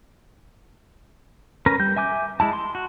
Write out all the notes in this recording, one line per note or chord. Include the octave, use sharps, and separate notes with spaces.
C#4 A#4 B4 A#5
G3 G6
E5 G#5 D6 G6
G#3 E4 A5
C6
F#4